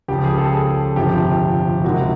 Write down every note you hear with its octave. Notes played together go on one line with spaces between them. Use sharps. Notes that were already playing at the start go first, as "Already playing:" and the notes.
C#2 C#3 F3 G4
G#4
A4
G#4
G1 F2 C3 F3 G4
C#2 C3 D#3 G#3 F#4